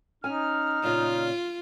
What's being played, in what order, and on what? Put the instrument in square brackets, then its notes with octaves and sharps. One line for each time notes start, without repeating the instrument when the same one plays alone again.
[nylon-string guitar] C#4 G#5 [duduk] D#4 [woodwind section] F6
[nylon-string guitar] A#2 C#3 D#5 [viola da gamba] F4